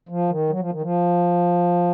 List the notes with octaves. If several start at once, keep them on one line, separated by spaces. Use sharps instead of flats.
F3
D#3
F#3
F3
D#3
F3